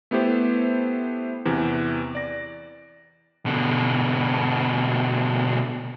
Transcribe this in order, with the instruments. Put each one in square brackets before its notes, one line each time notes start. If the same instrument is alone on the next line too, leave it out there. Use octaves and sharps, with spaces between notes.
[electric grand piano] A3 B3 E4 G4 C5
E2 C3 E3
D5 A#6
[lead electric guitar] B2 D3